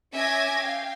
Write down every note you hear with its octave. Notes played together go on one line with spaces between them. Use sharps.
C#4 E5 G#5 D6 G#6 A#6
F5 G5